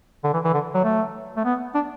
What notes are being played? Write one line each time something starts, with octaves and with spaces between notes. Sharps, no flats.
D3
E3
E3
D3
F#3
A3
A3
B3
D4